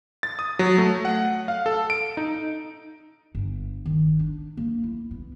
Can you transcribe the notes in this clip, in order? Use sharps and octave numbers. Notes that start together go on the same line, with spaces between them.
A6
D#6
F#3
A3
F#5
F5
A4
D7
D#4
G1
D#3
D4
A#3
E4
B3